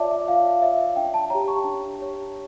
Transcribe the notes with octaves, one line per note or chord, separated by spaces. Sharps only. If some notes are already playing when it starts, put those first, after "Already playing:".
Already playing: F4 C#5 D5 E5 A5 D6
E5
F4 F5
C#5 E5
D4 G5
A5
G4 C#5 A#5
C#6
D4
G4 C#5